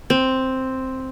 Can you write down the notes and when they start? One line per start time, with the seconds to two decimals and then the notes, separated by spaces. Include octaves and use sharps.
0.10 C4